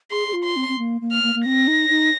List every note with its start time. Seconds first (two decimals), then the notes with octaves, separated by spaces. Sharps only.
0.11 G#4 C6
0.28 G#4
0.33 F4
0.45 C6
0.56 C4
0.68 C4
0.78 A#3
1.01 A#3
1.12 F6
1.23 A#3
1.35 A#3
1.46 C4 A#6
1.68 D#4
1.90 D#4